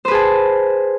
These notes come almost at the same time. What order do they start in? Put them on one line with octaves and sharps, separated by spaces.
C5 B4 G#4 A5